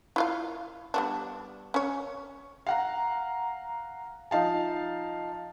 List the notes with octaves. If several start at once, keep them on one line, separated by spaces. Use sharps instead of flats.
E4 F4 F5
G3 B3 D4
C#4 C#5
F5 F#5 A#5
F3 D#4 F5 A5